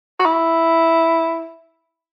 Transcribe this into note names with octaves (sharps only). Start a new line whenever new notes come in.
F#4
E4